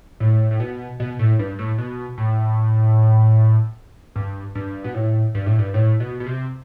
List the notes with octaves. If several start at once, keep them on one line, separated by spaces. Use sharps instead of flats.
A2
A2
B2
B2
A2
G2
A2
B2
A2
G2
G2
B2
A2
G2
A2
G2
A2
B2
B2
C3